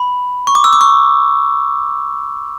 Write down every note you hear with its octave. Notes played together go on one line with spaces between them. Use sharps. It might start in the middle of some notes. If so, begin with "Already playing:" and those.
Already playing: B5
C#6
D6
E6
D6
C#6